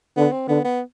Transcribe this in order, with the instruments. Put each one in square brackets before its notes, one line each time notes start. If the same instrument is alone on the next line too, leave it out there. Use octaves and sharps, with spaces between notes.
[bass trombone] D3 [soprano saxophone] B3
[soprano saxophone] C4
[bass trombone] D3 [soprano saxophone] B3
[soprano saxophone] B3